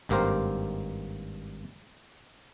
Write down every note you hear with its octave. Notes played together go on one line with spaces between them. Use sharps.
G#1 G2 A#3 G4 A#4 C5